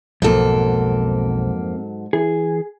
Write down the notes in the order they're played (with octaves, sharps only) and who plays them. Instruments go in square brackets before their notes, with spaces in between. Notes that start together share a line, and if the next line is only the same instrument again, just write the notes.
[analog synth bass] B1 [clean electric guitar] F2 A#3 [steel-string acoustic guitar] G#2 F#3 A4
[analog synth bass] E3 [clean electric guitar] G#4